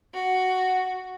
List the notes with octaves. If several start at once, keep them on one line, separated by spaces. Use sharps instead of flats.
F#4